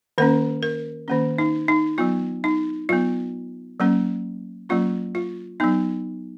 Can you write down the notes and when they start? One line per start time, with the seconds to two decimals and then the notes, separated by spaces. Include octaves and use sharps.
0.18 D#3 A#3 C#4 A#4
0.62 A#4
1.08 D#3 A#3 C#4
1.38 D#4
1.68 D#4
1.98 F#3 B3 F4
2.44 D#4
2.89 F#3 B3 F4
3.80 F#3 A#3 C#4
4.69 F#3 A#3 C#4 F4
5.15 F4
5.60 F#3 B3 D#4